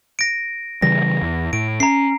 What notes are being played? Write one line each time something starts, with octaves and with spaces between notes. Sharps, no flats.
A#6 D7
C#3 E3 G3 A#6
E2
A2 D7
C#4 A#5 C7